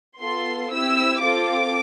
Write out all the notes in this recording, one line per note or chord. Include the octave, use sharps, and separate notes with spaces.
B3 F4 A4 C6
C4 E4 G4 E6
C4 F4 A4 D6